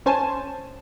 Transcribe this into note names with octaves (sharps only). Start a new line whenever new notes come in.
C#4 C5 G#5 A5